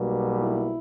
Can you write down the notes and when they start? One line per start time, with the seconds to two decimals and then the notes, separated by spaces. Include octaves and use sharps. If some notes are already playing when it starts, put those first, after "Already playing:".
Already playing: B1 B2 G3 A#3
0.41 E4